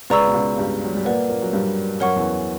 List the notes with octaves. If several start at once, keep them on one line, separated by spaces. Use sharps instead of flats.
C#2 C#3 B4 D5 A#5 C#6 E6
B2
C#2 C#3
G2 G3
F#3
G3
A#2 A#3 B4 D5 F#5
A#2 A#3
F#3
G2 G3
F#2 F#3 A#4 C#5 F#5 C#6
E2 E3